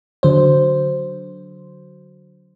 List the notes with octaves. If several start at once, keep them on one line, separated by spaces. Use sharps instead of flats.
D3 F#3 C5